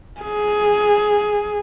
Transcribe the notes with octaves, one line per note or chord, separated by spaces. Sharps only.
G#4